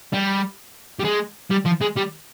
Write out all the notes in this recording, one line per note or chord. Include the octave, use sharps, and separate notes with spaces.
G3
G3
G#3
G3
F3
G#3
G3